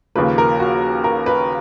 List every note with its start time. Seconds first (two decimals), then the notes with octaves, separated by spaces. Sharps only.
0.16 D#2 C#3 F3 A#3 B4
0.38 A#4
0.60 F#4
1.04 A#4
1.26 B4